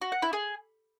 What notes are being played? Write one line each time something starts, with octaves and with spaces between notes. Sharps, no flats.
F#4
F#5
E4
G#4